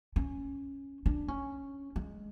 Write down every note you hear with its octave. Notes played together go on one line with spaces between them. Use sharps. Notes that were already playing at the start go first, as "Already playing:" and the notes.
C#4
D4
C#4
G#3